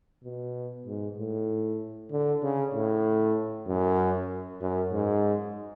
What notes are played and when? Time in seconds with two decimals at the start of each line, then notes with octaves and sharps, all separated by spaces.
0.24 B2
0.86 G#2
1.18 A2
2.11 D3
2.43 C#3
2.74 A2
3.67 F#2
4.61 F#2
4.92 G#2